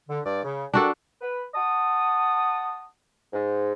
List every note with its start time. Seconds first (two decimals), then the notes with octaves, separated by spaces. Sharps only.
0.09 D3
0.25 G2 D5
0.44 C#3
0.74 D4 F#4 G4 A4 A#4 D5
1.21 B4
1.55 F#5 A5 D#6
3.32 G#2